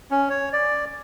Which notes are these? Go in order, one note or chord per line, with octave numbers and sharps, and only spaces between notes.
C#4
C#5
D5